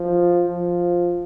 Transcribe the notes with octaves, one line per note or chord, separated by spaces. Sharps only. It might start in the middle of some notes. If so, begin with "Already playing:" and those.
Already playing: F3
F3